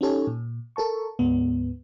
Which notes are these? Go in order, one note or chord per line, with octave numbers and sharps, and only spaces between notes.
C#4 D#4 G4 A4 C#5 G#5
A#2
A4 A#4 A5 C#6
D2 G#2 B3